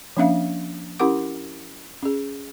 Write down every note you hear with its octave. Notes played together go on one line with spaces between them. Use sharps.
F3 A#3 C#4 D4 E5 F5
C#4 E4 G4 A#4 F#5 D6
C#4 G#4